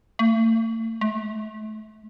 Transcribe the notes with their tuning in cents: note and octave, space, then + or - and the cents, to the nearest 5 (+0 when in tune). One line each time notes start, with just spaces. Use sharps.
A3 +45
A3 -30